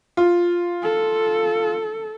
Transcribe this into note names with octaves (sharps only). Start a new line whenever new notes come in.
F4
A4